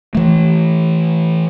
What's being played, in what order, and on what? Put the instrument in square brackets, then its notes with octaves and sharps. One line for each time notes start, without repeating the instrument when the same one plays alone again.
[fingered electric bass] E3 A3